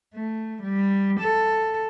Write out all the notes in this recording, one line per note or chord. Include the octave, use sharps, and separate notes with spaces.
A3
G3
A4